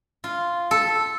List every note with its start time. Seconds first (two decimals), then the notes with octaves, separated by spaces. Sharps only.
0.24 F4
0.71 A4